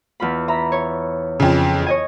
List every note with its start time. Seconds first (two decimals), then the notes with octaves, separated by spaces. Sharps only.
0.20 E2 F4 B5
0.48 E5 A#5 B5
0.72 C#5
1.40 F2 C#3
1.86 C#5 D#5 G#5